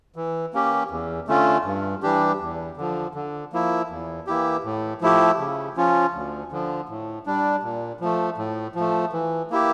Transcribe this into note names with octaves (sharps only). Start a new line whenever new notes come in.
E3
A#3 C#4 G4
E2
D3 A3 C#4 F4
G2
E3 G3 D4 G4
E2
D3 F3
D3
F3 A#3 E4
E2
E3 A#3 E4 G4
A2
F3 A3 E4 G4
C#3
F3 C#4 F4
D2
D3 F3
A2
G3 D4
A#2
F3 A3
A2
F3 A3
E3
A#3 E4 G4